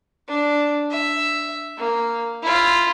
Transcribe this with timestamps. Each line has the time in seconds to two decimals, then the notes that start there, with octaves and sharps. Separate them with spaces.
0.28 D4
0.90 E5
1.78 A#3
2.43 E4 F4